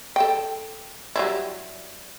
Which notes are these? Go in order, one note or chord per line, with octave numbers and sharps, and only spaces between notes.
A4 G5
F#3 G3 E4